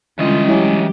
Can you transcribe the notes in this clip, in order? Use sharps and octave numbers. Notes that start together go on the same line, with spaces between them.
D3 E3 G3 G#3 C#4 F4 D#5
F#3 E4 G4 C#5 G#5